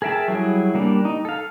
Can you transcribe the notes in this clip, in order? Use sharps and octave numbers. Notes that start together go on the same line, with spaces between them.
G#4 A#4 E5 G5 A5
F#3 G3 E4 G#4
G3 A#3 D4
D#4
A4 F5